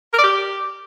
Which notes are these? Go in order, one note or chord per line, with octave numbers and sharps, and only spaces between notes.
A#4
D5
G4